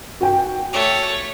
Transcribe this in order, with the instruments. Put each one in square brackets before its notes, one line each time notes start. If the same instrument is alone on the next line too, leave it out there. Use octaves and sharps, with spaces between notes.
[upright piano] F#4 G5
[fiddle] A3 C#5